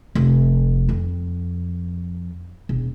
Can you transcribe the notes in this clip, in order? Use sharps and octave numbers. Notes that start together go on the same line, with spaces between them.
F1
F2
E1